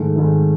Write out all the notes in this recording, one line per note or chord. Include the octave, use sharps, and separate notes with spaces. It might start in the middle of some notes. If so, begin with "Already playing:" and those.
Already playing: G#2 D#3 A3
G#2 D#3 A3